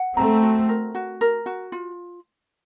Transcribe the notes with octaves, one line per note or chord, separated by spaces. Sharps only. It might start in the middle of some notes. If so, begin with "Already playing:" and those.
Already playing: F#5
A3 C4 A#5
F#4
A#4
F#4
A#4
F#4
F4